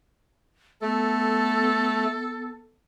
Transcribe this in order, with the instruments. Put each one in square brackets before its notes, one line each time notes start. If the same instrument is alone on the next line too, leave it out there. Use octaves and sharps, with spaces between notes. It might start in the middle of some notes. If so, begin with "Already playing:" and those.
[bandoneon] A3 [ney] B3 [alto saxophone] A4